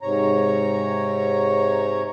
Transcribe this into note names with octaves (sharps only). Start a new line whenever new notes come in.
G#2 C3 C#5 A#5